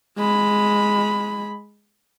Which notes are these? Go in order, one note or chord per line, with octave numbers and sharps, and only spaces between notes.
G#3 B5